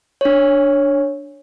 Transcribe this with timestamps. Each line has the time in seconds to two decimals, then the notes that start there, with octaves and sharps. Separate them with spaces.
0.21 D4 C#5